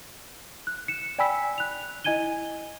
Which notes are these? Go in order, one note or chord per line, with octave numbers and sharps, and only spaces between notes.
F#6
C#7 E7
D5 G5 G#5 B5 E6 B6
F#6 F7
E4 D#5 G#5 G#6 D#7 G7